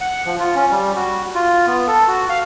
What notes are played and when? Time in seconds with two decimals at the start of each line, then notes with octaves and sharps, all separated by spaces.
0.01 F#5
0.26 F3
0.40 F4
0.55 C#4
0.71 G3
0.96 F#4
1.35 F4
1.67 B3
1.88 A4
2.08 F#4
2.29 F5